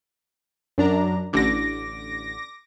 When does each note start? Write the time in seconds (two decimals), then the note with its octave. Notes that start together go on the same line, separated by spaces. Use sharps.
0.78 F#2 D4 A#5
1.33 A1 D3 D6 A#6